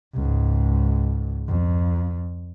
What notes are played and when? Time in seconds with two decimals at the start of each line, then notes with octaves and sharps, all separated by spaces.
0.14 C#2 G#2
1.48 F2